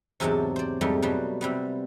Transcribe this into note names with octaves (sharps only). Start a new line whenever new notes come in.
E2 G#2 C3 F#3 D4 A5
C5 D5
F2 G#2 G3 A3
B2 F#3 G3
C3 G3 B3